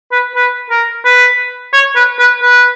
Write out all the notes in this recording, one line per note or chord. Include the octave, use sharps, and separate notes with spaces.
B4
B4
A#4
B4
C#5
B4
B4
B4